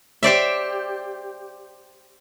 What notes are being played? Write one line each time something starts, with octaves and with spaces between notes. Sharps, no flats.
G4 C5 D5 E5